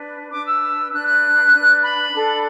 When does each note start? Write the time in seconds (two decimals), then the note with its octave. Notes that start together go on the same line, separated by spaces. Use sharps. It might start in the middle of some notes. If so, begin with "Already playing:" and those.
Already playing: D4 B4
0.30 D4 B4 D6
0.46 E6
0.91 D4 B4 F#6
1.06 F#6
1.52 D4 B4
1.82 B5
2.13 D4 A4